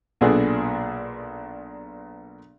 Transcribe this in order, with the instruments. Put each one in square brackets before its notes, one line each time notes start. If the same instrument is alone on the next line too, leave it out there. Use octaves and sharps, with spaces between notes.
[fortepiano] B1 A#2 B3 D4 G#4 A4